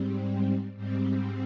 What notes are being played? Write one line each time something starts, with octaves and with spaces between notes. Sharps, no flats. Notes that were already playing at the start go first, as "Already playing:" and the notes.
Already playing: G#2 G3 C4
G#2 G3 C4